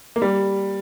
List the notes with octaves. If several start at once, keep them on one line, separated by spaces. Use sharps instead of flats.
A#3
G3